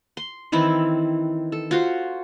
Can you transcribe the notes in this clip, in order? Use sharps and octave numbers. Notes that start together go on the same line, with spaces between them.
C6
D#3 E3 C4 E4
A4
F4 F#4 C5